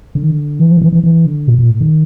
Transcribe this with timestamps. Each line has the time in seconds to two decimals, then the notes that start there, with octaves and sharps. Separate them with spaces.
0.15 D3
0.23 D#3
0.30 D3
0.59 E3
0.71 F3
0.77 D#3
0.82 E3
0.93 E3
1.04 E3
1.26 D3
1.48 A#2
1.58 A#2
1.70 A2
1.81 D#3